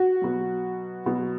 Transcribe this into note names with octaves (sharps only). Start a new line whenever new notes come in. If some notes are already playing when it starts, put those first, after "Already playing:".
Already playing: F#4
B2 F#3
B2 F#3